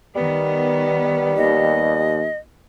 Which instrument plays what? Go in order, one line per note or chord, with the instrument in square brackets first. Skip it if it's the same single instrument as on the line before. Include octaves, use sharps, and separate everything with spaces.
[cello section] D#3 B3 [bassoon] G3
[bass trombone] D#2 [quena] D#5